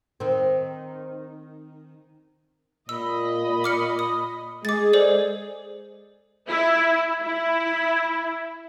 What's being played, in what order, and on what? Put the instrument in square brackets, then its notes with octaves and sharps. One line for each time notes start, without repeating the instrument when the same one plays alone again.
[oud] D#3 C4
[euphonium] A#2 [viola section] D#5 B5 [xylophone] E6
[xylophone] D6 F6 C#7
D#6
[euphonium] G#3 [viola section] G#4 [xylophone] D6 A6
[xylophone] A4 C5 D5
[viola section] E4
E4